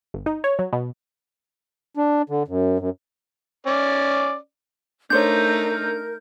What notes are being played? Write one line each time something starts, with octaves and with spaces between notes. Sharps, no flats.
G1
D#4
C#5
F#3
B2
D4
D3
F#2
F#2
C#4 D5
A3 D4 D#4 A#4 C5 C#5 G6